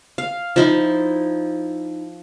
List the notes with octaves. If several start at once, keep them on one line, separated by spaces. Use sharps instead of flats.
F5
F3 D#4 E4